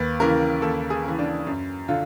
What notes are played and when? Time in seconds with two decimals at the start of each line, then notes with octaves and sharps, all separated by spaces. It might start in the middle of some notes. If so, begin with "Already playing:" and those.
Already playing: D#2 B4
0.20 C#3 E3 A#4
0.62 D#2 A4
0.90 G#4
1.04 C#3 E3
1.19 D4
1.47 F#2
1.88 D3 F4